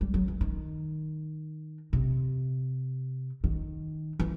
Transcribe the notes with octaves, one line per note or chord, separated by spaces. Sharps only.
G3
F#3
E3
D#3
C3
D#3
E3